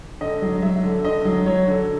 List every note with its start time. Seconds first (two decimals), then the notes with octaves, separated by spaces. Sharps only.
0.21 D3 D#5
0.42 F#3
0.62 F#3 E5
0.83 D3
1.04 D3 D#5
1.25 F#3
1.46 F#3 C#5
1.68 D3